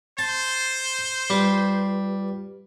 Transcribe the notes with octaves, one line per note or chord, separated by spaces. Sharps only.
C5 A5
G3 F4 G4 B4